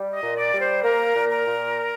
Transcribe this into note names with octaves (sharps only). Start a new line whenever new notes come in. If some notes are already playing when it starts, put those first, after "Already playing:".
Already playing: G3
D#5
A#2
D5
G3
C5
A#3 A#4
A#2
A#4
A#2